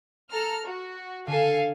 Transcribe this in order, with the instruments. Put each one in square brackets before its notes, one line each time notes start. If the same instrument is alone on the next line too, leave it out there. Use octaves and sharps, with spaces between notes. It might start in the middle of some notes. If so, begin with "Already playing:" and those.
[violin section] A4 A#5 F6
F#4
[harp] D3 [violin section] A4 F5 G#5